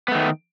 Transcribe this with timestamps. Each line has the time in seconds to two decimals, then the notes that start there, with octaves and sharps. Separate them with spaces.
0.08 B3
0.12 A3
0.15 D#3